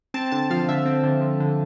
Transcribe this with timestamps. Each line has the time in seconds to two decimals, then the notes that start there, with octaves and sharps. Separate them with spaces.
0.14 C4 A5
0.32 D3 A5
0.50 F3 F5
0.69 D3 E5
0.85 C4
1.04 D3
1.21 F3
1.40 D3